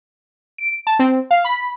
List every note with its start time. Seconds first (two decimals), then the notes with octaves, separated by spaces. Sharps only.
0.58 D7
0.87 A5
0.99 C4
1.31 F5
1.45 B5